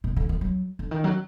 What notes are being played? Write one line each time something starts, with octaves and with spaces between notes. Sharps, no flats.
A#2
D3
D#3
F#3
D3
D#3
F#3